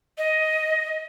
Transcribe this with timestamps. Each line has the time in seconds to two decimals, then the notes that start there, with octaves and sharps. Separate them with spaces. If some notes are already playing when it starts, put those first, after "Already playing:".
0.18 D#5